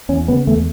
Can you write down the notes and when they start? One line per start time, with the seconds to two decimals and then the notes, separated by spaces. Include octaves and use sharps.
0.09 E2 C#4
0.28 C#3 B3
0.47 E2 A3